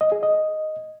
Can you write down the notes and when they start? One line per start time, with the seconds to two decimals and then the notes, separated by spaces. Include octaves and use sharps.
0.01 D#5
0.12 G#4
0.23 D#5